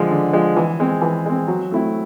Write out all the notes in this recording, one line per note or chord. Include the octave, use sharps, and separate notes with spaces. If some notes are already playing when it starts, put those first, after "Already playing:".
Already playing: D3 F3 G#3
D3
F3 G#3
E3
G#3 C4
E3
G#3 C4
F#3
A3 C4 E4